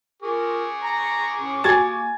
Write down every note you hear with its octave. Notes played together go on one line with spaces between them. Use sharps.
F4 G#4 A#4 C#6 D6
A#5
A2 C#4
A#3 F#4 G4 G#5 A5 G#6 A6